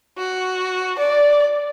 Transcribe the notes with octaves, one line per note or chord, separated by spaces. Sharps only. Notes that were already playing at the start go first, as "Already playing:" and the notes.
F#4
D5